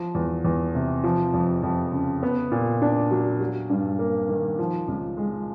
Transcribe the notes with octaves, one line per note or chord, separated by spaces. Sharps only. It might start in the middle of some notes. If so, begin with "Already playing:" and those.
Already playing: F3
E2
E2
C3
F3
F2
F2
C#3
B3
A#2
D4
F#3
F#3
G2
A#3
D#3
F3
C#2
G#3